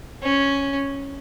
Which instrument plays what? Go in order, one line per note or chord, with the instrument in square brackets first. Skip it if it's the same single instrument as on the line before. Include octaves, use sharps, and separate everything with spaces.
[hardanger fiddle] C#4